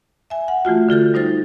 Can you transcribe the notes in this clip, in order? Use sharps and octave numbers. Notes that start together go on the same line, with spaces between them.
E5 G#5
F#5
E3 A3 F4 F#4
D3 F4 A4 G6
G3 D#4 C5 A6